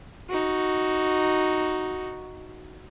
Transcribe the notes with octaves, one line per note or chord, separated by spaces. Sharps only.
D#4 F#4